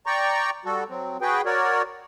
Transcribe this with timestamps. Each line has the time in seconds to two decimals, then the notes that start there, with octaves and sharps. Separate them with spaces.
0.06 D5 G5 A#5 C#6
0.65 G3 F#4 A4
0.89 F#3 C4
1.21 F#4 G#4 B4 G5
1.46 F#4 A#4 C#5 D5